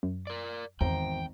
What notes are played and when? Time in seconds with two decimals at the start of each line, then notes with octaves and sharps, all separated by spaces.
0.03 F#2
0.27 A#4 D5
0.81 G#1 E2 C5 G5 A#5